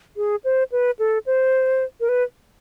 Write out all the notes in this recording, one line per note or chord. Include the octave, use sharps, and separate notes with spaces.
G#4
C5
B4
A4
C5
A#4
B4